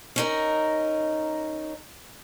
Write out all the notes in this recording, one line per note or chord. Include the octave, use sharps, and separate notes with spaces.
C#4 D#4 A#4